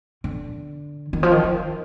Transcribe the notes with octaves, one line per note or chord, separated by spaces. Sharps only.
D3
D#3
F3
D#3
D#3